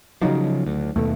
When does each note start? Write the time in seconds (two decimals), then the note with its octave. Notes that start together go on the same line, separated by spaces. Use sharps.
0.22 C#3 F3 F#3 D#4
0.66 D2
0.96 D#2 B2 A3